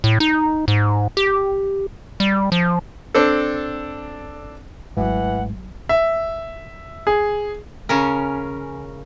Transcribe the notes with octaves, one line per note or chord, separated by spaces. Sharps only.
A2
D#4
G#2
G4
G3
F3
C4 D4 A4
G#1 G#2 E3 F#3 G#3 A3 F#5
E5
G#4
C#3 C#4 A#4